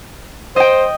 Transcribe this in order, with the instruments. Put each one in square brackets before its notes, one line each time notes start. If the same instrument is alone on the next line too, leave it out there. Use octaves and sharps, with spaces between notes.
[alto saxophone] C5 [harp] D#5 G5